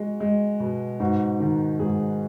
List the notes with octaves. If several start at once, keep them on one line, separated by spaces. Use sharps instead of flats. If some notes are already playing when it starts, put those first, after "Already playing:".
Already playing: G#3 F#4
G#3
B2
G#2 F#4
D#3
G#2 G#4